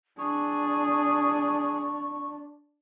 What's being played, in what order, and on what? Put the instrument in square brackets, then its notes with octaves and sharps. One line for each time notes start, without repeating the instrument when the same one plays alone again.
[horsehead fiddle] D4 [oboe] G#4 [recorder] C#6